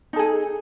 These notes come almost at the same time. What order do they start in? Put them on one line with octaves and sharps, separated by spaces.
D#4 A4 G#4